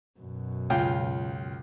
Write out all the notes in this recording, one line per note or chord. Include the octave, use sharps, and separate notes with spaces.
F#2 B2
C#2 F4 G5